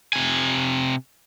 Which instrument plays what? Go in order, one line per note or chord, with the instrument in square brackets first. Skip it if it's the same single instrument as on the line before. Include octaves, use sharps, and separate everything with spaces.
[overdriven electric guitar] C3 G#5